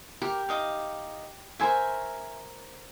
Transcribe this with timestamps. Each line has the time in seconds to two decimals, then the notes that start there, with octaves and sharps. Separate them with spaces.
0.22 G4 A#4
0.49 D#4 D#5 F5
1.59 A#4 C5 E5 G#5 C#6